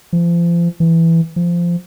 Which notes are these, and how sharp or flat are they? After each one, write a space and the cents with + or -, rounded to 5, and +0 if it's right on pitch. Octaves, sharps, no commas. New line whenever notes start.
F3 -35
E3 +5
F3 -15